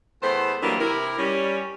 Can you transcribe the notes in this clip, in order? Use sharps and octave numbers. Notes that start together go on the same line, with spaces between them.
E2 A3 B3 C5
D#3 E3 F#3 G3 A#3 D4
C3 E4 G4 A#4
G3 C#4